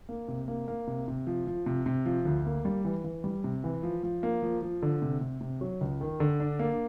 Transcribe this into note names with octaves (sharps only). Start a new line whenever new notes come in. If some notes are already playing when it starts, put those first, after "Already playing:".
A#3
C3
A#3
A#3
C3
C3
F3
F3
C3
C3
F3
D2
A#3
G3
E3
E3
G3
C3
E3
F3
F3
A#3
F3
F3
D3
C3
C3
C3
F#3
C#2
D#3
D3
D4
A#3